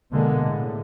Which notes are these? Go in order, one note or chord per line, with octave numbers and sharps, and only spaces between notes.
B2 D3 G#3 A#3
A2